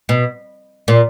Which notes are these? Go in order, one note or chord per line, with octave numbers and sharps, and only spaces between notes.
B2
A#2